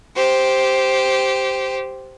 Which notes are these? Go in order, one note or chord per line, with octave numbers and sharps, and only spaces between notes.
G4 C5